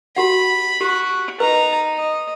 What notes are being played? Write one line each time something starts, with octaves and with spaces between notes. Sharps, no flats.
F#4 G4 F#5 B5
F#4 G4
D#4 B4 A#5
D#5